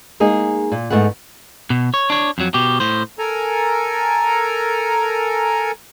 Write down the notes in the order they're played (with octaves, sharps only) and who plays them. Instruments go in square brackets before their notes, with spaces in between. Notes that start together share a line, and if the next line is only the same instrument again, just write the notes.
[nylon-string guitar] G#3 A#3 D#4 G#4
A#2
G#2 A3 B3 F#5
[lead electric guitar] B2
C#5
D4 C#5
F2 F#3
B2 G4
A2 C5
[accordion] A4 A#4 G#5 A#5